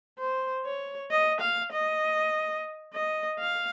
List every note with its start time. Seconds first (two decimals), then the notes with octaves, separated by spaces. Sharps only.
0.19 C5
0.66 C#5
1.11 D#5
1.41 F5
1.72 D#5
2.94 D#5
3.40 F5